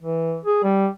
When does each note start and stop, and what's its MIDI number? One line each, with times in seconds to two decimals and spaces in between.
0.02 0.38 52
0.45 0.59 68
0.63 0.88 55